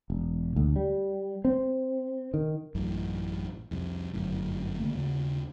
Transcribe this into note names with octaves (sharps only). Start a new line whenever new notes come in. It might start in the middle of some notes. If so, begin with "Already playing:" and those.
E1
D2
G3
C4
D#3
A1 F#2 A2 E3
C2 F2
G1 F#2 A2
D3 A3 A#3
D#2 C#3